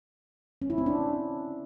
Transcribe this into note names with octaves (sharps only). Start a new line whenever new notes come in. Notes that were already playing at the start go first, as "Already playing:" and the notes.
C#4
E4
C4
D4